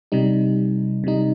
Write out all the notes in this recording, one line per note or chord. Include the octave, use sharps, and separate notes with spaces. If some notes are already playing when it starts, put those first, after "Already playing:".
C3 G3 D#4
C3 G3 D#4